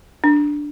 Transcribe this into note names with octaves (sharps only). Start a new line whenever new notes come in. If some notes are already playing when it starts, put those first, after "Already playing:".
D4